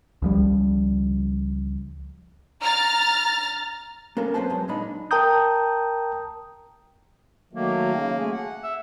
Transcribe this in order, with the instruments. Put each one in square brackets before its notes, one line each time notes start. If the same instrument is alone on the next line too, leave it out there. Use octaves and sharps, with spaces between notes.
[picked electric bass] C#2 F3 G3
[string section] A#5 F6 A6
[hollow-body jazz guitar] A#3 B3 C#4 A4 A#4
F#2 C4 B4 C5 A5
F#2 G#3
A#2 D4 D#4 B5
[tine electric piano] A#4 G5 A5 A#5 D#6 G6
[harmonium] D#3 F#3 A3 [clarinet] A#3
[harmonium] C#3
A3 G#4
F#5
[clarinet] E5